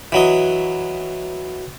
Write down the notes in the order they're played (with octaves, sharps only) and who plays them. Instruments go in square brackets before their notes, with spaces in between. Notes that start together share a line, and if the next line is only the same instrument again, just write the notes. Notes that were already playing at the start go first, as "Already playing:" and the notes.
[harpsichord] E3 F#3 D#5